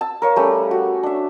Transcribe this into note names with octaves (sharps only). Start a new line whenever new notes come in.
A5 E6
A#4 C#5 F5
G3 A3 C#4
F#4
D4 E5